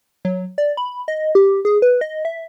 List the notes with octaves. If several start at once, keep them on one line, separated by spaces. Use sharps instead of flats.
F#3
D5
B5
D#5
G4
G#4
B4
D#5
E5